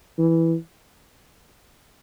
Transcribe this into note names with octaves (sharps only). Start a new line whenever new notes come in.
E3